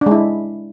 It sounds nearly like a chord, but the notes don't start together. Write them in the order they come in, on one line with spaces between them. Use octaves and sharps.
D4 G#3 E4